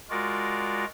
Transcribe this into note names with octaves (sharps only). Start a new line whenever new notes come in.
G#3 F4 F#4 A#4 D5